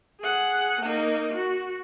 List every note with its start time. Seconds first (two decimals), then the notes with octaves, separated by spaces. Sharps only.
0.21 G#4 F#5
0.81 A#3 D#4
1.33 F#4